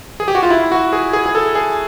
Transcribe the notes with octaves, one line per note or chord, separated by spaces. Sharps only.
G#4
G4
F#4
F4
E4
F#4
G#4
G#4
G#4
A4
G#4